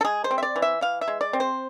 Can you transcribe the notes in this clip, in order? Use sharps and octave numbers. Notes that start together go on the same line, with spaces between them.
A4
G#3 G#4
C5
C4
E5
D5
E3
E5
E3 F5
E5
G#3
D5
C4
C5